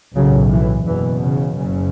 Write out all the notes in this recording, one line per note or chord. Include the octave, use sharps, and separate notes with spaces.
B1 A2 C#3 F#3
E3
F#1 E2 B2 E3
C#3
F#1 F#2 C#3